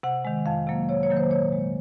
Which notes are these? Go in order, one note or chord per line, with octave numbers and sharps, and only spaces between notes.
C3 F#5
D#3 G#3
F2 F5
C3 F#3 A#3
C3 C#5
C#5
D#3 F#3 A#3
C5
A#2 C#5
G#3